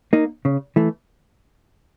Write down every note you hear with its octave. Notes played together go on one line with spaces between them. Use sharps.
A#3 D#4
C#3
E3 A3